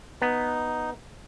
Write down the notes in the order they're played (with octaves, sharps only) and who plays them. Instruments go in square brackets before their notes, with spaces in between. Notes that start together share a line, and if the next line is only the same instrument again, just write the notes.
[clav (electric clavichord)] B3 [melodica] D#4